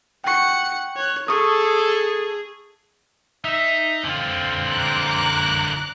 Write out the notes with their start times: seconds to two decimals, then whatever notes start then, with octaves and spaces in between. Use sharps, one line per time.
0.24 F#5 G5 C#6 C#7
0.96 C#5 F#6
1.28 G#4 A4 C#6 D#6
3.45 D#4 D#5 E5
4.04 D3 C4 F4
4.70 A#5 D6 F#6